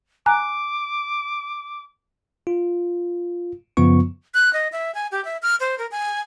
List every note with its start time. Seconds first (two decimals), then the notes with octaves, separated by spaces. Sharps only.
0.26 G#5 A#5 D6 F#6
2.47 F4
3.77 F#2 C#3 F3 B3 F4 C#6
4.34 F#6
4.53 D#5
4.72 E5
4.95 G#5
5.12 G4
5.25 E5
5.43 F6
5.60 C5
5.78 A#4
5.92 G#5